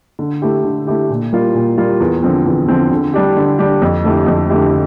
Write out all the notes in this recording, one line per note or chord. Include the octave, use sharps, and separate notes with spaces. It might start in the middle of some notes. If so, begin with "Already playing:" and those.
D3
A3 E4 G4
D3
A3 E4 G4
A#2
G3 A#3 F4
A#2
G3 A#3 F4
E2
D3 F3 C4
E2
D3 F3 C4
D3
G3 D4 G4
D3
G3 D4 G4
F2
D3 A3 E4 G4
F2
D3 A3 E4 G4